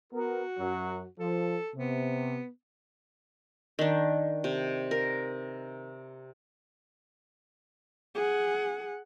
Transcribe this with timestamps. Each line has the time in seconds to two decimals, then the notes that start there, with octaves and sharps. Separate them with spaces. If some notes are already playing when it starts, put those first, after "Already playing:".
0.13 B3 F#4 A#4
0.59 F#2 F#3
1.19 F3 A4
1.76 C3 B3
3.79 D#3 D4
4.44 C3
4.91 A#4
8.15 G#4 F#5